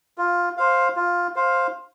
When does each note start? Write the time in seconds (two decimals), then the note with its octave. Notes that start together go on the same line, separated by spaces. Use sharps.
0.18 F4
0.57 C5 F5
0.96 F4
1.36 C5 F5